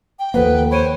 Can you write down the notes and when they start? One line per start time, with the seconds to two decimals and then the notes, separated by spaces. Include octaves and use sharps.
0.19 G5
0.34 D#2 F3 A#3 A4 B4 C5 F#5
0.71 C5 C#5 B5 D7 D#7